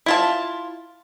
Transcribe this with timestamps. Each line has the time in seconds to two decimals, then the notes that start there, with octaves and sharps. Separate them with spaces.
0.06 E4 F4 A5